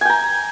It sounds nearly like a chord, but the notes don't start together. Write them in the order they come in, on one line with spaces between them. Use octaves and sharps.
G#5 G5 A#5